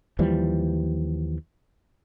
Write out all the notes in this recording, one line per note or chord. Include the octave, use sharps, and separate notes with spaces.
D#2 E3 F3 G3